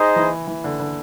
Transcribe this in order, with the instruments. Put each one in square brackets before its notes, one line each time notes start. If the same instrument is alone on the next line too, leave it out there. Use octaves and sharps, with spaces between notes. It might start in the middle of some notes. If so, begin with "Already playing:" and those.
Already playing: [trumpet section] D#4 G#4 C5 D#5
[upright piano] E3
E3
D3
D3